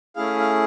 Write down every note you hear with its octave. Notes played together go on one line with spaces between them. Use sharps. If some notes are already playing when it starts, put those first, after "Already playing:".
A3 C#4 E4 G#4 F5
F5